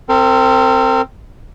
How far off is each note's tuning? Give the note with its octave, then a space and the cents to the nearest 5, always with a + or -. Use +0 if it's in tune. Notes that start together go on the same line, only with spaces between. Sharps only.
C4 +0 A#4 -40